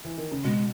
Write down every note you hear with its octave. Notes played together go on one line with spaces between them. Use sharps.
E3
D#3
C#3
B2 G#3